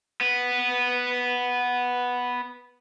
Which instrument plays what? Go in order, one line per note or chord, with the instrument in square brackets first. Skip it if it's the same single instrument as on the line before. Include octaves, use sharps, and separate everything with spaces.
[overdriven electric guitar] B3 B4